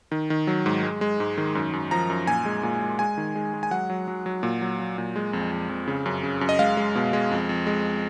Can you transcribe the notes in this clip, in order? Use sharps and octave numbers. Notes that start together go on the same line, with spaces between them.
D#3
D#3
F#3
G#2
G#3
G#3
G#2
D#3
F#2
F#2
F3 A#5
F#2
A#2 G#5
G#3
A#2
G#3
G#3 G#5
D#3
G#3
G#3
G#5
F#3 F#5
F#3
F#3
F#3
A#2
F#3
F#3
A#2
G#3
F2
F2
F2
C#3
F#2
C#3
F#2
D#5
G#3 F5
G#3
B2
G#3
F2
F2
G#3